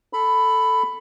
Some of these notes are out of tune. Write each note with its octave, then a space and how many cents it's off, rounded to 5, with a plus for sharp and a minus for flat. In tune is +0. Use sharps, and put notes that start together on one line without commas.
A4 +0 B5 +10